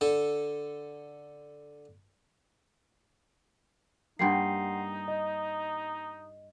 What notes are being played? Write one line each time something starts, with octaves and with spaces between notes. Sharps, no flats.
D3 A4
G2 G3 A#3 D#4 F#5 C6 C7
D#5